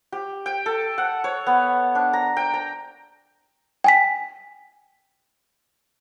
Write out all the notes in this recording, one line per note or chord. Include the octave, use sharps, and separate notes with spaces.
G4
G5
A4
F#5
C#5
B3
D4
A#5
G5
A#5
G5 G#5 B6